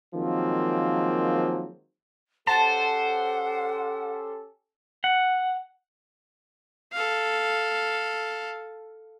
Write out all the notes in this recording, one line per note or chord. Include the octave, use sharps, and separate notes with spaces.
D#3 F3 F#3 G#3 A#3 C4
C#4 G4 A4 C5 F#5 A5
F#5
A4 F5